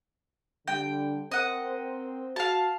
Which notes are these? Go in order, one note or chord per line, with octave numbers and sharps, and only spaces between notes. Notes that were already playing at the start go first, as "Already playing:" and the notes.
D3 G3 G5
C4 A#4 C5 D#5 F#5
F#4 F5 A5